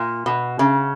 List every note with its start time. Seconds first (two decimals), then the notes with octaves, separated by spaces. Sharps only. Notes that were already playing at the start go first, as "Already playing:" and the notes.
Already playing: A#2
0.26 B2
0.59 C#3